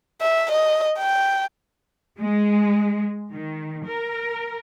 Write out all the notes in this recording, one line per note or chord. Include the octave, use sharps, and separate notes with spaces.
E5
D#5
G5
G#3
D#3
A#4